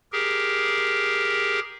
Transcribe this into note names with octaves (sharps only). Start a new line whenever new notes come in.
G4 G#4 A#4